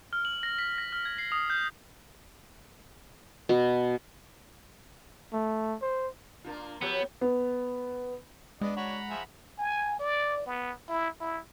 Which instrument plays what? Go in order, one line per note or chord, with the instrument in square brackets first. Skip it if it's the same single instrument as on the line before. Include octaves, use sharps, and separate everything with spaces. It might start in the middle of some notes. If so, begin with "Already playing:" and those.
[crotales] F6
F#7
A#6
B6
A#6
F6
G#6
C7
D#6
G6
[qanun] B2
[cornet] A3
C5
[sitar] A#3 D4 F4
[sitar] F3 G4 C#5 [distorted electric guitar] B3
[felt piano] B3
[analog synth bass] G#3 [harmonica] B3 D5 D#5 [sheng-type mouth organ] D4
[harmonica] D4 F#4 C#5 [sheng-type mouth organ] F#5 A#5 B5
[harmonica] F3 G#4 E5
[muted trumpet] G#5
D5
B3
E4
E4